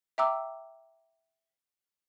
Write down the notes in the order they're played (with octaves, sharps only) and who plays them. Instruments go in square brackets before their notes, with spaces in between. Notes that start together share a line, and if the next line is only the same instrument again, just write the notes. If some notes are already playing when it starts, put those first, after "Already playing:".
[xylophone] E5 G5 A#5 D6 E6